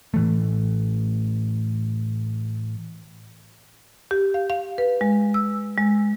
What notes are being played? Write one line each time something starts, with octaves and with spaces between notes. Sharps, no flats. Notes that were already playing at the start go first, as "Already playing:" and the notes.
A2 E3 A3
G4
F5
F5
B4
G#3
E6
G#3